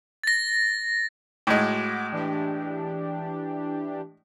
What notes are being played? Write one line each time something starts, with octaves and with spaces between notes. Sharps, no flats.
A6 A#6
A2 G#3 F#4 D6
E3 D4 G4